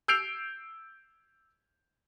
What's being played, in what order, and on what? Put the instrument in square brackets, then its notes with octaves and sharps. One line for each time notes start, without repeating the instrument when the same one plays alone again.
[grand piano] E6 G6 C7 D7 F7